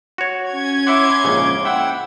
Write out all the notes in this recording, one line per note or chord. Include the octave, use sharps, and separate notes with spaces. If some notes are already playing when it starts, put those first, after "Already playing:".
F#4 C#5
C#4 G#6
E4 E5 F#5 C6 D6
A#1 G#2 C#3
E4 F#5 G5 E6